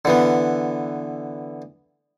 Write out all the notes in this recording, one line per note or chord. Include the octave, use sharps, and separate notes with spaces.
D3 E3 B3